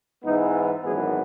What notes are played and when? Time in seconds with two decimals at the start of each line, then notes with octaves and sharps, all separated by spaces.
0.24 G#2 E3 G#3 B3 D#4
0.83 G#1 F#2 E3 B3 G#4